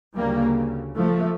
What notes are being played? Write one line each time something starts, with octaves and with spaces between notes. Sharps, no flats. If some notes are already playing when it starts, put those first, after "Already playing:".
D2 C#3 G3 A#3
F3 A3